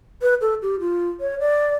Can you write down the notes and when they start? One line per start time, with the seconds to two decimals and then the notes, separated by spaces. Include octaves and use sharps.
0.22 B4
0.41 A4
0.62 G4
0.80 F4
1.21 C#5
1.40 D5